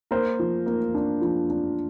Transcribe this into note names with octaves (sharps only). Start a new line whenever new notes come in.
A#3 A#4 C5
F3
A#3
D4
F3
D4